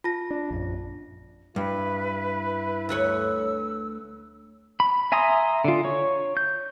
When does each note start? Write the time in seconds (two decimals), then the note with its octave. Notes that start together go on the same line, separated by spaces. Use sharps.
0.04 F4 A5 A#6
0.30 D4
0.50 A#1 F#2
1.56 G2 E4 B4
2.89 D2 B4 C#5 E6
4.80 B5
5.12 E5 G#5 A#5 C6 D#6
5.64 D3 F4
5.85 C#5
6.37 G6